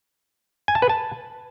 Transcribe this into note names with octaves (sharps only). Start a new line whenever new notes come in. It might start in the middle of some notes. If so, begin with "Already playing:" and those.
G#5
A5
B4
A5